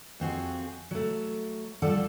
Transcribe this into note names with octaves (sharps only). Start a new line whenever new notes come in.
F2 C4 F#4 G#4
F#3 A3
F3 G3 A4 D5 F#5 A5